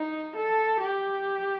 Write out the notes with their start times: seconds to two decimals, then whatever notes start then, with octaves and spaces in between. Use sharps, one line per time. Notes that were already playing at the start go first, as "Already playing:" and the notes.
Already playing: D#4
0.36 A4
0.81 G4